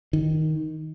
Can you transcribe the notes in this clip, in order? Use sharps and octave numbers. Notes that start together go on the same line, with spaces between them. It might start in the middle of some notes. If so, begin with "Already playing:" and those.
D#3